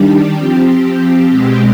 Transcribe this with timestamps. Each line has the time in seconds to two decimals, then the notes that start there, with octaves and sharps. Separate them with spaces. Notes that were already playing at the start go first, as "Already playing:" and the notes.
Already playing: D#3 G3 D4 G4
0.36 F3 C4 G4
1.30 B2 G#3 C4 G4